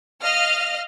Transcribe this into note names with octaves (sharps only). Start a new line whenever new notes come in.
D#5 F5 F6